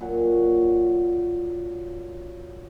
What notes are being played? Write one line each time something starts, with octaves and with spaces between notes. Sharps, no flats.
A#2 F#3 F#4